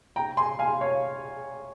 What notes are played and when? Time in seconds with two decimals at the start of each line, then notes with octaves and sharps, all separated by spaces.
0.16 G5 A#5
0.37 G#5 C6
0.59 F5 G#5
0.81 C#5 F5